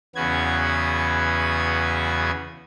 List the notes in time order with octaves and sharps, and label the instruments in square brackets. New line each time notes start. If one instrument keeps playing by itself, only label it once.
[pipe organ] E2 C#3 B3 F#4 G#6